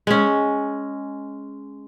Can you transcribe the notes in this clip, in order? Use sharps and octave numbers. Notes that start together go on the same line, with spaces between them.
G#3 C#4